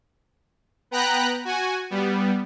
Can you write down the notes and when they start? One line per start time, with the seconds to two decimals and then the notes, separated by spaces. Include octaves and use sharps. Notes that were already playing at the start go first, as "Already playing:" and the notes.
0.91 B3 B4 G5 A#5 B5 F#6
1.45 F#4 G#5
1.90 G3 B3